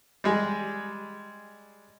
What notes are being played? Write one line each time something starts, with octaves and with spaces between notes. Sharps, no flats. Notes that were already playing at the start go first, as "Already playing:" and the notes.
G3 G#3 G#4